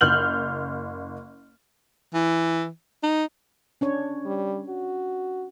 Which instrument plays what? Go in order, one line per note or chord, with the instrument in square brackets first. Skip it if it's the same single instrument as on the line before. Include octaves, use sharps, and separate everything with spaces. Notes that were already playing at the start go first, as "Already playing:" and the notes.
[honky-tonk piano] F#1 F6 G6 F#7
[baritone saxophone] E3
D#4
[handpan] C#4 D4 C#5
[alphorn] G3
F#4